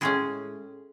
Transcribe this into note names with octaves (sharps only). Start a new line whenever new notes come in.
A2 G#3 C#4 G#4